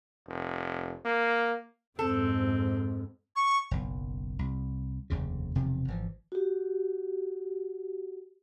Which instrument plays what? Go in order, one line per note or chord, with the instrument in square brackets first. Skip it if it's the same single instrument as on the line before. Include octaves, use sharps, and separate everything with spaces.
[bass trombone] F1
A#3
[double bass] F2 G#2 [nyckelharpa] C4 [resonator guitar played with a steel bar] A4
[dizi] C#6
[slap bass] F#1 B1
C2
F1 D#2 C#3
E1 C3 D#3 F3
G#1 E3 F3
[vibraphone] F#4 G4